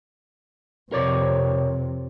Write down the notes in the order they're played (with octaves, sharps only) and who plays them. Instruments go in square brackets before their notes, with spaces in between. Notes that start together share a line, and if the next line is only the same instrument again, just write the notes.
[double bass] F2 C3 [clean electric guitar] A#4 C#5 D5